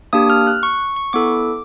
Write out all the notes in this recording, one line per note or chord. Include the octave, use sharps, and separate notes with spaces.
A#3 D4 G4 D#6
F6
F#6
C#6
C#6
B3 E4 A4 D6